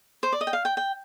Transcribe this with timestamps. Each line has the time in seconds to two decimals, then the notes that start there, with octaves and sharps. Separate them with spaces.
0.23 C5
0.32 D5
0.41 D#5
0.47 G5
0.53 F5
0.65 G5
0.77 G5